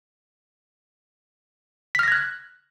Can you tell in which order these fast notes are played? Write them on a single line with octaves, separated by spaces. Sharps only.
B6 F6 A#6 G#6 F#6